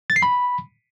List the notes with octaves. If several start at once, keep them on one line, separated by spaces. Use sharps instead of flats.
A6
C7
B5